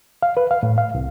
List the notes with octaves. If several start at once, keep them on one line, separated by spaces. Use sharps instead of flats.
F5
B4
F5
A2
F5
C2